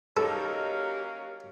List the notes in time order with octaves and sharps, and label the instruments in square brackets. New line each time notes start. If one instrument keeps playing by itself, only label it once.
[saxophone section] F#3 A#3 C#4 [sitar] G3 D#4 G4 [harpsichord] A4